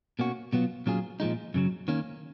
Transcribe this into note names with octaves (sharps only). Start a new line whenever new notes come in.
B2 A#3 C#4 F#4
B2 F#3 B3 F4
A#2 F#3 C#4 F4 G#4
A#2 F3 G#3 D#4
F#2 C#3 F#3
D#3 A#3 C#4